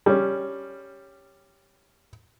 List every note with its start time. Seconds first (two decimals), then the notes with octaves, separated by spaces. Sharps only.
0.06 G3 C#4